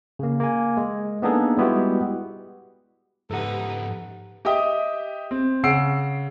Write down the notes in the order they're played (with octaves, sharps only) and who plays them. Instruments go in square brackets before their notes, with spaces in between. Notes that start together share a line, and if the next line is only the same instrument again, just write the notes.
[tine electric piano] C#3 A#3
A#3 G#5
G#3
A#3 B3 D4 D#4 G#4 A4
G3 G#3 B3 E4 F#4 G4
[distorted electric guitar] G#2 F3 [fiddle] D#4 B4 [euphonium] G4 [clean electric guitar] A4 F#5
[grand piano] G4 D#5 E5 G5 D#6
C4
C#3 F#5 E6 C7 D7